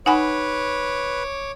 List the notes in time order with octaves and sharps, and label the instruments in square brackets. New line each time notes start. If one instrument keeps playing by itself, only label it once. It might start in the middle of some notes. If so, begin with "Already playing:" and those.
[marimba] D#4 [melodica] B4 [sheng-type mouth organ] C#5 D6 [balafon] F#5 G#5 B5